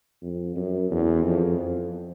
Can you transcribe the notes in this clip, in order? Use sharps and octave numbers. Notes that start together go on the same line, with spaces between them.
F2
F#2
E2
F2
F2